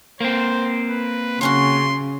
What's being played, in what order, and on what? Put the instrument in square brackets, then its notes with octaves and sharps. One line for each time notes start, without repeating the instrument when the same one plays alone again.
[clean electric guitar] A#3 C4 [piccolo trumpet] C5
[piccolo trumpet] B4
[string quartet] C#3 [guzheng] F#3 C#4 F#4 [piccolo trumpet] C6